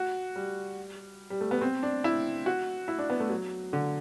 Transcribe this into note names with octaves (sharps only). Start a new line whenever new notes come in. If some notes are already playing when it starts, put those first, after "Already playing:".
Already playing: F#4
G3
G3
A3
B3
C4
D4
E4
F#4
E4
D4
B3
A3
F#3
D3